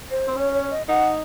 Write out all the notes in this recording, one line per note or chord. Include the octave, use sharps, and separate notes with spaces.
C5
C4
C#4 C#5
C#5
D#5
D#4 F#5